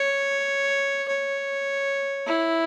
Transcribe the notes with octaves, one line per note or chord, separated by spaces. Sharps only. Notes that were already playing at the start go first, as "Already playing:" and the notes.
Already playing: C#5
C#5
E4